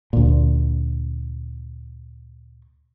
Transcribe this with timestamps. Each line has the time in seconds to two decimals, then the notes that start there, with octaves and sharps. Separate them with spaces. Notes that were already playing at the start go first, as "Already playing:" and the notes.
0.13 D2 A#2